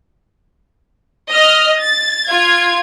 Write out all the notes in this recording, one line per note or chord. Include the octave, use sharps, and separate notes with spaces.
D#5 F6
A6
F4 G#6